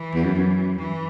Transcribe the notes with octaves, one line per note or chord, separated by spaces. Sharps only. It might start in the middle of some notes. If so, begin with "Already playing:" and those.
Already playing: E3
E2
F#2
F#2
F#2 E3